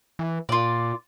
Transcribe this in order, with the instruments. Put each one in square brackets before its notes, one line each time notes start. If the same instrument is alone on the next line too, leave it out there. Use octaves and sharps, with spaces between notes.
[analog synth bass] E3
[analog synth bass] A#2 [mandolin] F4 D5